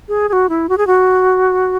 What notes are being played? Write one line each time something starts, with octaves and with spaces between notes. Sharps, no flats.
G#4
G#4
F#4
E4
F#4
G#4
F#4